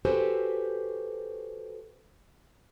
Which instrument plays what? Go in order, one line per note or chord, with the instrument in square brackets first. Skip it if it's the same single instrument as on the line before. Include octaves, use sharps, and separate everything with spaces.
[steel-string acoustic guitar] F#4 G4 A4 B4 C5 G#5